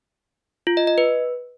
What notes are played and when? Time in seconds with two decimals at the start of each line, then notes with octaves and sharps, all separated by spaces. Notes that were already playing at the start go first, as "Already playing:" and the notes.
0.67 F4
0.77 D#5
0.87 D#5
0.98 B4